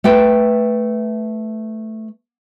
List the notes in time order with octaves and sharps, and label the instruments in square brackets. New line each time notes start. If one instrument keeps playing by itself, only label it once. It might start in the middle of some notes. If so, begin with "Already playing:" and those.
[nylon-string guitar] A3 B4 G5